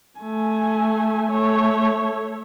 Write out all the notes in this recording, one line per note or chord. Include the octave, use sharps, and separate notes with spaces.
A3 G#5
A3 C#5